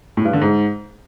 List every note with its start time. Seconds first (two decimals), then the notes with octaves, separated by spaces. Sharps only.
0.17 A2
0.25 G2
0.33 D3
0.41 G#2